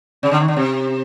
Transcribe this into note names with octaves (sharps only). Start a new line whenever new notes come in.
C#3
D3
D#3
D3
C3